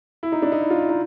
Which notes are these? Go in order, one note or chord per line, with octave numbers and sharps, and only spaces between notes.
E4
D#4
D4
D#4
E4
F4
E4
D#4